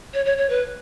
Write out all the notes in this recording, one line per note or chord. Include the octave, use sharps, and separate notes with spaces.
C#5
C#5
C#5
B4